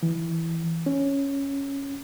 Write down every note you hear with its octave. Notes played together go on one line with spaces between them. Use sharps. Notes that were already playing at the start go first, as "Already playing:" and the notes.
E3
C#4